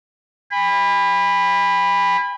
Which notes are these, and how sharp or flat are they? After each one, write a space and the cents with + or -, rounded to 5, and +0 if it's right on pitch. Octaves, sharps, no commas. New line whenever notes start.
G#5 -45 B5 +0